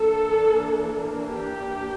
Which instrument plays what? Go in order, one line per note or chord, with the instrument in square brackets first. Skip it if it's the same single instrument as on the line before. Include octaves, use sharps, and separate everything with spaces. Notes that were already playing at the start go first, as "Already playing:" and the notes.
Already playing: [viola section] E3 A#3 D4 A4
G4